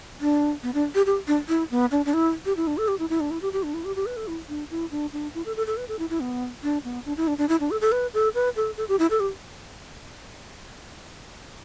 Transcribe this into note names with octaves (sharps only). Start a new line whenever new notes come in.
D4
B3
D4
G4
G4
D4
E4
B3
D4
D4
E4
G4
E4
D4
A4
G4
E4
E4
D4
E4
G4
G4
D4
E4
G4
G4
B4
A4
E4
D4
E4
D4
D4
E4
A4
A4
A4
B4
A4
E4
E4
B3
D4
B3
D4
E4
D4
D4
E4
D4
A4
A4
B4
A4
B4
A4
A4
G4
E4
A4
G4